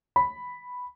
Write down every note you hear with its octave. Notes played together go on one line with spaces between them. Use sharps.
B5